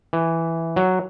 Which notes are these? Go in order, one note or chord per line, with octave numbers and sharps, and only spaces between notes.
E3
F#3